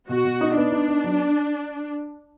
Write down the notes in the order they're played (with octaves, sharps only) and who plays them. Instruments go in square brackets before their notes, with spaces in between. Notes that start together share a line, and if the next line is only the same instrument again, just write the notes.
[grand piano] B2 [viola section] F#4
[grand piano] B2
D#4
[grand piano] B3 [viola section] D4
[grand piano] D#4
B3
F#3